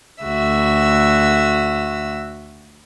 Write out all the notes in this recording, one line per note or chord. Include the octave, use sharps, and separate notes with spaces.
D2 F#4 E5 E6